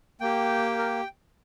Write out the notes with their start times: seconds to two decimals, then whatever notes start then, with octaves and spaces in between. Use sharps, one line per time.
0.21 A#3 G4 G5
0.78 A#4